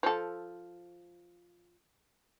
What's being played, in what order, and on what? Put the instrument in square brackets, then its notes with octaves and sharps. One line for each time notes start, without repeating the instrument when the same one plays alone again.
[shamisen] F3 A4